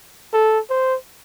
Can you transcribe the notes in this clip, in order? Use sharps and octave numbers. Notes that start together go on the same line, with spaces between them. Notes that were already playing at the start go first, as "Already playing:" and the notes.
A4
C5